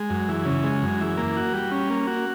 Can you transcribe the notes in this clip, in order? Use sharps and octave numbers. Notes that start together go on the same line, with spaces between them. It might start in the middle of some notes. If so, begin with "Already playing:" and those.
Already playing: G#3
F#2
E3
C#3
G#3
F#2
E3
A#3
F#4
G3
C#4
A#3
F#4